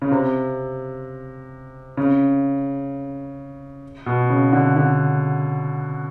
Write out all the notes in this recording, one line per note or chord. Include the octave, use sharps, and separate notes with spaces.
C#3
C3
C#3
B2
C#3
D3
D3